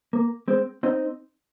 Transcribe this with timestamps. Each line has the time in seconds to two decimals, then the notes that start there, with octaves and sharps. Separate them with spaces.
0.13 A#3
0.48 G#3 C4
0.83 C4 D#4